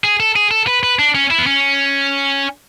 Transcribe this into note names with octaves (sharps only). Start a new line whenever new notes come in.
G#4
A4
G#4
A4
B4
B4
D4
C#4
E4
B3
C#4